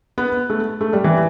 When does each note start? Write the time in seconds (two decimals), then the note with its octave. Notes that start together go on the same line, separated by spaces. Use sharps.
0.18 B3
0.50 A3
0.81 A3
0.93 G3
1.04 E3